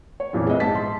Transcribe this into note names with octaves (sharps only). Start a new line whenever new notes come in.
C#5
F2 A#2 E3
G#3 B3 C4 D#5 E5
G#2 A5 B6
C6